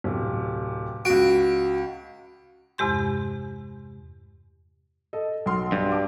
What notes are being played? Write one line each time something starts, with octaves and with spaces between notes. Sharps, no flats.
D1 C3
C#2 F#4 D7
E2 G2 C3 G#3 G4 C6
A4 D#5
B1 C6 F6
G2
A5 D6